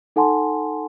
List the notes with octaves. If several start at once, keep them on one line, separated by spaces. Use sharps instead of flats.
D#4 A4 F#5 G#5 A5 C6